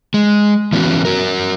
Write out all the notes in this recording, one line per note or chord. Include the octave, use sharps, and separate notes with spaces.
G#3
E3 A3 B3 C#4 F#4
F#4 A#4